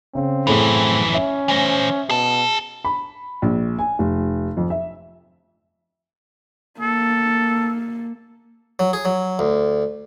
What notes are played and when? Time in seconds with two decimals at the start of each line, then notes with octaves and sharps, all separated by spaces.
0.15 C#3 C4
0.47 F#2 A2 E3 G#4 A4
1.14 C#4 E5
1.48 E3 C5
2.09 B2 G#4 A5
2.85 B5
3.42 A#1
3.79 G#5
3.99 F1
4.57 F2
4.70 E5
6.80 A#3 A4
8.79 F#3
8.93 G#4
9.05 F#3
9.39 D2